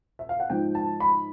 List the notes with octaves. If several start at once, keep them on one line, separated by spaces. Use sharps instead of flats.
E5
F5
F#5
G#2 F3 G5
A5
B5